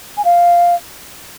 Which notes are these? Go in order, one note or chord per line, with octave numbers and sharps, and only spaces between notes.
G#5
F5